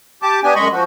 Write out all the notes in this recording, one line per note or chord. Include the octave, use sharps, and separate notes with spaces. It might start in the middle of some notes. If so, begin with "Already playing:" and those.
G4 A5 D6
B3 D4 G4 G#5
F#2 G#3 D#5 B5 C#6
F3 F#4